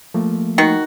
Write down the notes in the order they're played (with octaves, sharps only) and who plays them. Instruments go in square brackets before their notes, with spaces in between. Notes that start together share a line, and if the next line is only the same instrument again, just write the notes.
[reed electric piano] F3 A3 A#3
[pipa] D#3 F#4